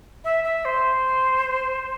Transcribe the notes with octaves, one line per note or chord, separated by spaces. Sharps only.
E5
E5
C5